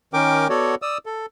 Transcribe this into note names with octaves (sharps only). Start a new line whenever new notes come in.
D#3 C#4 A#4 G5 D6
B3 F#4 A4 C#5 D5
D5 D#6 E6
A4